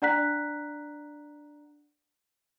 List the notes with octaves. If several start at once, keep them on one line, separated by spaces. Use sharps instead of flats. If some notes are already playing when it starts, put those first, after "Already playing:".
D4 D5 F#5 A#5 F#6 B6